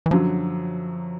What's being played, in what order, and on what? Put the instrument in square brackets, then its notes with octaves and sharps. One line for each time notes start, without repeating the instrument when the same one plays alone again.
[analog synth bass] E3
[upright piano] F#2 D3 F#3 [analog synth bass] F3